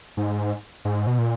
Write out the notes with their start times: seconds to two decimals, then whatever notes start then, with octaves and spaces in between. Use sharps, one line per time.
0.17 G#2
0.85 G#2
1.07 B2
1.18 A#2